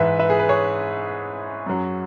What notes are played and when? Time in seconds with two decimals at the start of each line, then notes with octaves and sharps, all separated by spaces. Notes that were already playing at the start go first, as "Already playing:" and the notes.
Already playing: G#2 E3 B4 E5
0.19 B4 E5
0.30 G#4
0.39 B4
0.49 G#4 C#5
1.66 F#2 F#3